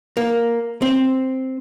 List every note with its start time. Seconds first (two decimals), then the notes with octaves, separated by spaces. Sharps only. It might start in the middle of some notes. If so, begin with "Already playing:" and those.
0.17 A#3
0.82 C4